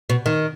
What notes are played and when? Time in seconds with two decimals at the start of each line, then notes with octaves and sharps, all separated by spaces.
0.10 B2
0.26 D#3